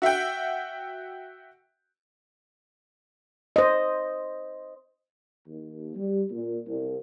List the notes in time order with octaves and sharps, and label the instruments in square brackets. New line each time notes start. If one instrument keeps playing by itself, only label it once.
[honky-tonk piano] F#4 E5 F#5 G5
[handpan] C5 D#5
[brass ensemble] D#2
G3
A#2
C2